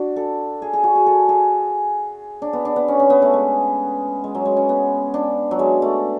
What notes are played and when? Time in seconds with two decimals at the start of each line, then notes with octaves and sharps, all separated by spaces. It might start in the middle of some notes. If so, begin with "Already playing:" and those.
Already playing: D4 F#4
0.16 A4
0.62 G#4
0.73 G#4
0.84 F#4
0.95 G#4
1.06 A4
1.29 G#4
2.42 D4
2.53 B3
2.65 D4
2.76 B3
2.88 C#4
2.99 C#4
3.10 B3
3.22 A3
3.33 G#3
4.24 G#3
4.35 F#3
4.45 G#3
4.57 C#4
4.69 B3
5.14 D4
5.51 F#3
5.59 G#3
5.82 A3